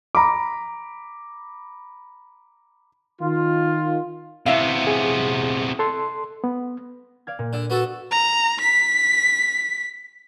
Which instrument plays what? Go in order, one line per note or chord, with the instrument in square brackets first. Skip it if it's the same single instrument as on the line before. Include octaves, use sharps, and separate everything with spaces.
[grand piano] A#5 B5 D6
[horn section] D#3 F4
[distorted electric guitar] C3 B3 [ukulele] E4 E5 F5
[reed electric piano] G#4
A4 C6
B3
[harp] D5 F5 G#6
A#2
[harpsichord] D3
B3 F#4 A4
[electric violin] A#5
B6